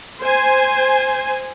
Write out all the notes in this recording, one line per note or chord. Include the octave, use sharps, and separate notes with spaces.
C5 G#5